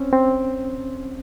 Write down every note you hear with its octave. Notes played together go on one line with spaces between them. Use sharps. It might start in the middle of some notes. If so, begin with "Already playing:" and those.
Already playing: C4 C#4
C4